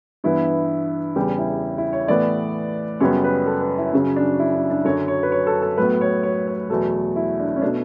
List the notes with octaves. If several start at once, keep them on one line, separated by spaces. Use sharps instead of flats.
G2 E3 B3 E4
E2 C#3 G3 G4
E4
E4
C#5
A2 E3 B3 D5
F#2 C#3 G3 B3 C#5
B4
A4
B4
E4
F#2 C#3 F#3 C#4
D4
E4
D4
D4
F#2 D3 F#3 C#5
C#5
B4
C#5
A4
A4
A2 F#3 B3 B4
C#5
C#5
C#5
E2 B2 F#3 A3 A4
E4
D4
C#4
B2 A3 D4